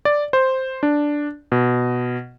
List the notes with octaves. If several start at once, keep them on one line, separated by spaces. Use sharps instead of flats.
D5
C5
D4
B2